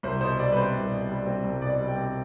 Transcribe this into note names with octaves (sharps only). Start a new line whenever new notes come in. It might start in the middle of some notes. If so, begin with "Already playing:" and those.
C2 C5
B2 C5
G3 D5
B4
C4 C5
C2
B2
G3
C4
C2
B2 D5
G3
G5
C4